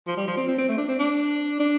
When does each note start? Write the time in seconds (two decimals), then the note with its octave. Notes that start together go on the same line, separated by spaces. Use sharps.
0.07 F3
0.17 G3
0.27 F3
0.37 C4
0.48 C4
0.58 C4
0.68 A3
0.78 D4
0.89 C4
0.99 D4
1.60 D4